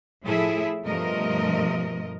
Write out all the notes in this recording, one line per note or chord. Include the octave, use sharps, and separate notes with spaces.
A2 F3 E4 G#4 A4 E5
G2 B2 F3 A3 A#4 D#5